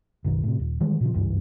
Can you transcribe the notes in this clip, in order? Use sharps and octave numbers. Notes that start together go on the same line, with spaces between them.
F#1 B1 D#3
A2 C3
D#1
D#3 E3 G3 G#3
A#2 C#3 F3
F#1 C#2 G2 E3